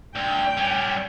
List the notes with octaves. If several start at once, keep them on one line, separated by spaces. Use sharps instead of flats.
D2 G5
G3 C#4